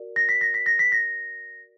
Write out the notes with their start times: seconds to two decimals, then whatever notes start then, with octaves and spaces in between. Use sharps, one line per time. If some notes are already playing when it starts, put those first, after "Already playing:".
Already playing: F#4 A#4 D5
0.16 A#6
0.29 B6
0.41 A#6
0.54 B6
0.66 A#6
0.79 B6
0.92 A#6